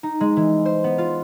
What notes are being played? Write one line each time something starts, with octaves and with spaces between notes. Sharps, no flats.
D#4
G#3
E3
C5
B3
F4